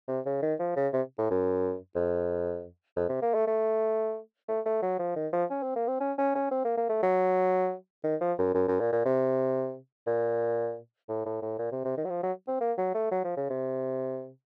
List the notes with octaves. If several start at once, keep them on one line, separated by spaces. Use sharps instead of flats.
C3
C#3
D#3
F3
C#3
C3
A2
F#2
F2
F2
C3
A#3
A3
A3
A3
A3
F#3
F3
D#3
F3
C#4
C4
A#3
C4
C#4
C#4
C#4
C4
A#3
A#3
A3
F#3
D#3
F3
F#2
F#2
F#2
A#2
A#2
C3
A#2
A2
A2
A2
A#2
C3
C3
D#3
F#3
F3
F#3
C4
A#3
F#3
A3
F#3
F3
C#3
C3